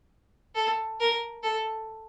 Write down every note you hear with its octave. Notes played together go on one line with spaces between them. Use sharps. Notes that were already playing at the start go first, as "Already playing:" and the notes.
A4
A#4
A4